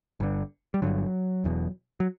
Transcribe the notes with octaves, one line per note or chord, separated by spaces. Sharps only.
G1 G2 D3
G3
G1 G2 D3 F#3
E1 E2 B2
F#3